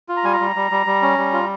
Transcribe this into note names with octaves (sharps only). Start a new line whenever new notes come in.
F4
A#5
G3 G#5
A#5
G3
G3
G3
G3
C#4
G3
F4